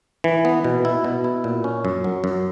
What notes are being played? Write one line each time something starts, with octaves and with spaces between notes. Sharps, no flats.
E3
B3
B2
E4
B2
E4
A#2
C#4
F#2
F#3
F#2